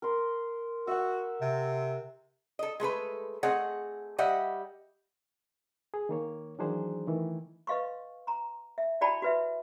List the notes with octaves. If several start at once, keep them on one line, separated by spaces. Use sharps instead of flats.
A#4 C6
F#4 E5 F#5
C3
A4 D#5
G#3 A3 A4 B4
A3 C4 G#4 D#5 F#5
G3 G4 D#5 E5 F#5
G#4
D#3 A#3 C#5
D#3 E3 F#3 D4 G#4 C5
D#3 E3 A3
B4 D#5 F5 C6 C#6
A#5 C6
E5
E4 F#4 D5 G5 A5 B5
F#4 B4 E5